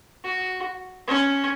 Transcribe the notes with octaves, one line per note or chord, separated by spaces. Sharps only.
F#4
C#4